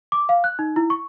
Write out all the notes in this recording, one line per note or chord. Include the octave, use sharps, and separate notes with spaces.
D6
F5
F#6
D#4
E4
C#6